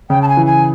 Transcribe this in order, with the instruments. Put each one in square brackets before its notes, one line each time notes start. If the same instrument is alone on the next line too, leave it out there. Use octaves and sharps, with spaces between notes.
[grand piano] C#3 [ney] G5
[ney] A5
G#5
[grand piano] E3
[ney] G#5